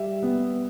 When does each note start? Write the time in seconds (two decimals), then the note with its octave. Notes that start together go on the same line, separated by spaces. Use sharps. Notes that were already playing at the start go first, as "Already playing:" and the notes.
Already playing: G3 E5
0.22 B3